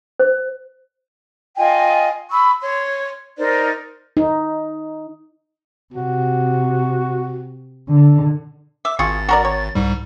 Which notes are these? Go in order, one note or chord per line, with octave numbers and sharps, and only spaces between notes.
C5
F4 D#5 G5 G#5
B5 C#6 E6
C#5 C6
D#4 A#4 C5 D5
D#4
C3 F#4
D3
E5 D6
G#1 F4 G#4 C#6 A6
F#4 A#4 D5
C#5
C2 G#2 G3